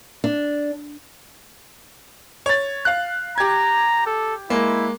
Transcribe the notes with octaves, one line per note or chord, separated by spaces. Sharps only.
D4
C#5 A6
F5 F#6
G4 A#5 G#6
A4
G#3 A#3 E4